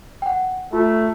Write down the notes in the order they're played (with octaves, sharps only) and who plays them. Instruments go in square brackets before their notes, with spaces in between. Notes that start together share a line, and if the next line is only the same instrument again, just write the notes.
[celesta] F#5 G5
[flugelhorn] A3 [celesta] F4